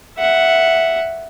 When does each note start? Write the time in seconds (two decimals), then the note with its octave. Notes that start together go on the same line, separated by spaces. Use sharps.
0.18 E5 F#5